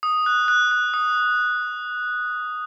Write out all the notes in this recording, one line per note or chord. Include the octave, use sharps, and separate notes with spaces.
D#6
F#6
F#6
F#6
D#6